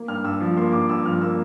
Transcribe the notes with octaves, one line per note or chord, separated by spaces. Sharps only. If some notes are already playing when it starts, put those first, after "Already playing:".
Already playing: A#3
G2 F6
G2 E6
F3
A#3 C6
G2 D6
G2 E6
F3 F6
A#3 E6